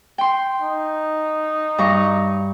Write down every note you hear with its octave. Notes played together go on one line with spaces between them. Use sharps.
G5 C6
D#4
G2 A#5 C#6